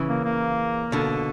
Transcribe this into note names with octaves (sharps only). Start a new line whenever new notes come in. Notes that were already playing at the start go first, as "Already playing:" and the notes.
Already playing: C#3 E3
A#3
A#3
B2 D3